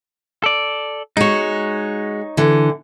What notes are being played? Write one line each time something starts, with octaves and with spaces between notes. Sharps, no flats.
A4 D5
G#3 D#4 F#4 C#5
D3 E3